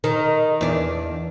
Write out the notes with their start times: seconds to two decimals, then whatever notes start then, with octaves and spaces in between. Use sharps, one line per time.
0.04 D#3
0.61 E2 D4